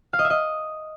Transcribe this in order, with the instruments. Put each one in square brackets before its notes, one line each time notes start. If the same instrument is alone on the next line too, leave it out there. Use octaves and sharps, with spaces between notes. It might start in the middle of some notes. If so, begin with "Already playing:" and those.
[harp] F5
D#5
E5
D#5